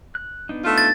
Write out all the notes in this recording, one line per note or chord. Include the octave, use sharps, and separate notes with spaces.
F#6
B3 D4 D#4
A3 F4
A6